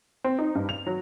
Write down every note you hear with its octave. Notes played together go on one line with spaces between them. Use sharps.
C4
D#4
G2
F7
F#3